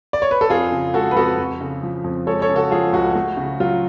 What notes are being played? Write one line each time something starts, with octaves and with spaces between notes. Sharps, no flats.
D5
C#5
B4
A4
F2 F4 G#4
C#3
G#3 F#4 A4
B4
F2 F#4 A4
F2
C#3
F3
F2
G#3 A4 C#5
A4 C#5
C#3
F#4 A4
F3 F4 G#4
C#2 F#4
A3
C#3
F#3 F4